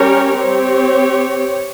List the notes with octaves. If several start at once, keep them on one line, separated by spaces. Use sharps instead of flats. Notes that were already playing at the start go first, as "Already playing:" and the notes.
Already playing: G3 C#4 G4 A#4 C#5
C4 G4 C#5